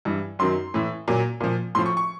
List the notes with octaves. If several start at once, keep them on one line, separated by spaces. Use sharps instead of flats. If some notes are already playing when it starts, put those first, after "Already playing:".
G2 E3
F#2 D#3 F#3 C6
A2 E3
A#2 F#3
A#2 F3
A2 F3 C6
C#6
C#6